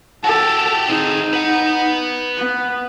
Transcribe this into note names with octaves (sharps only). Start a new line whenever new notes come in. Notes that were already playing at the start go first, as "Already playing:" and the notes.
F#4 G4 A4
C4 D#4 G#4
B4 F#5
B3